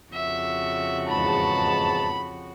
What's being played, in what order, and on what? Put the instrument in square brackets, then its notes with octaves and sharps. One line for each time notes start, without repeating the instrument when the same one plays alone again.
[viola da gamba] F2 C#3 F#4 [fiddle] E5
[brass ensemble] E2 G#2 A5 [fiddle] B5